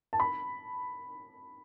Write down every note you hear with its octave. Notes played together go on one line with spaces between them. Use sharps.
A5
B5